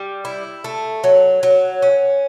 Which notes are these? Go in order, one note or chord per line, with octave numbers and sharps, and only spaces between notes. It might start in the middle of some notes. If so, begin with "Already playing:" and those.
Already playing: G3
E4
A3
F#3
F#3
C#4